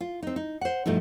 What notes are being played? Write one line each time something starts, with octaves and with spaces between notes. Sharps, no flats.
F4
C4 D#4
D#4
C5 F#5
G2 B2 F3 A3 D#4